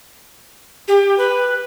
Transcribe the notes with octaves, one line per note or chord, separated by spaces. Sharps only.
G4
B4